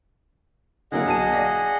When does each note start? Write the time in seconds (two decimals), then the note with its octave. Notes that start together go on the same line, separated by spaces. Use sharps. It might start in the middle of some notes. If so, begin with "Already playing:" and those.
0.92 D3 F#3 A#3 G#4 D#5 F#5
1.06 B1 A5 D#7
1.33 D5 F5 A#6